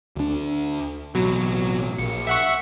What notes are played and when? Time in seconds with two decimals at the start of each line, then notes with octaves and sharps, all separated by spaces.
0.16 D2 D4
1.15 A1 B2 F#3
1.98 A#1 C#7
2.27 E5 F#5 C#6